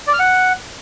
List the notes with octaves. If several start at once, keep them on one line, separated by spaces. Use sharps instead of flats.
D5
F6
F#5